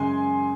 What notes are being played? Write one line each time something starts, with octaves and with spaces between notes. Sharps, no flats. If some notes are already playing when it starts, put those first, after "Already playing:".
Already playing: F#2 C#3 G#3 G#5 C6